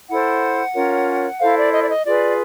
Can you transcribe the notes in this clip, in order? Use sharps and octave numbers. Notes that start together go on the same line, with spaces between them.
E4 A4 C5 F#5
C#4 F4 A#4 C#5
E4 A4 C5 F5
D5
D#5
D5
D#5
F4 G#4 B4 D5